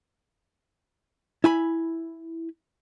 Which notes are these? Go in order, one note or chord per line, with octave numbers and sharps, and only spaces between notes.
E4 G#5 B5